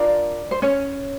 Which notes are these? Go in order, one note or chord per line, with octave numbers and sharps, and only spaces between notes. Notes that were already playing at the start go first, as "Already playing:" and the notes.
Already playing: D4 F4 A#4 D5
C5
C#4 C#5